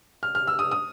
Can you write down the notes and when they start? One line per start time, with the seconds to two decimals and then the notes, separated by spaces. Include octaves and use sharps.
0.23 F6
0.35 F6
0.47 E6
0.59 D#6
0.71 D#6